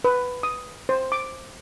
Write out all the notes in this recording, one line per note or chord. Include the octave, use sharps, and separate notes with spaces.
B4
D#6
C5
D6